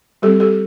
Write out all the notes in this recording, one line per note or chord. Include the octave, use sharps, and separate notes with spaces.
G3 C4 G4 A4
G4 A4